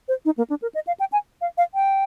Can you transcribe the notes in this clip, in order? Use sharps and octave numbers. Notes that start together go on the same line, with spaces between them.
C5
D#4
A#3
D4
A#4
D#5
F5
G5
G#5
F5
F5
G5